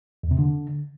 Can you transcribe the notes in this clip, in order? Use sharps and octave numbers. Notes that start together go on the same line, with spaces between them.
E2
C3
D3